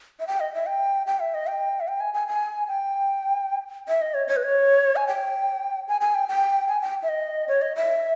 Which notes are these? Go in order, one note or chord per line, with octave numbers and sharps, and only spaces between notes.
E5
G5
D#5
E5
G5
G5
E5
D#5
G5
E5
G5
G#5
G#5
G#5
G5
E5
D#5
C#5
C#5
B4
C#5
G#5
G5
G#5
G#5
G5
G5
G#5
G5
E5
D#5
C#5
D#5
E5